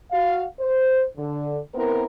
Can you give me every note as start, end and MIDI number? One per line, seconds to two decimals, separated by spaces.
0.12 0.44 66
0.12 0.44 77
0.60 1.03 72
1.17 1.58 50
1.74 2.03 59
1.74 2.03 60
1.74 2.03 64
1.74 2.03 70